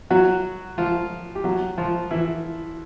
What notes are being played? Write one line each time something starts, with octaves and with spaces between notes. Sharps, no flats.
F#3 F#4
F3 F4
G4
F#3 F#4
F3 F4
E3 E4